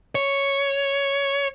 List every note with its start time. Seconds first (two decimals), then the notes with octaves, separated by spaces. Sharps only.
0.15 C#5